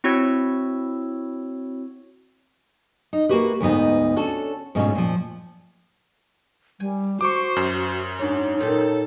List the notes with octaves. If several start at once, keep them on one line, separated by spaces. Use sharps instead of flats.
C4 E4 F#4 C#5 E6 G#6
D#4
A#3 C#4 E4 F#4 G4 B4
D2 G#2 B3 D#4 C5
C#4 D4 F#4 A4
G#2 B2 A3 C#4 D4 F4
A#2 F3
G3 G#5
F#4 C5 C#6 D6
F#2
G#2 D4 F#4 C#5
A#2 D#4 G4 A4